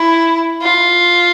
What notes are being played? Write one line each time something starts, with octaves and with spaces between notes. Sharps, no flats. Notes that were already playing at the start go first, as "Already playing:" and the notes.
Already playing: E4
F4